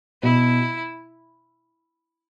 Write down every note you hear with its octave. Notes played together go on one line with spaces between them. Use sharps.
B2 E4